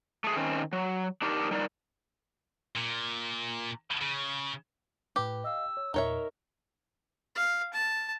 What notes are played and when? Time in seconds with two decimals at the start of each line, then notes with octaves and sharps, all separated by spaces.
0.24 A3 G#4
0.36 D#3 C4 C#4
0.73 F#3
1.22 D4 D#4 G4 A#4
1.51 G3 D#4 A#4 D5
2.76 A#2
4.01 C#3
5.16 A2 G4 B4
5.44 D#5 F5 E6
5.77 C#5
5.94 E2 A#2 D#4 A#4 C#5 E5
7.35 F5
7.73 A5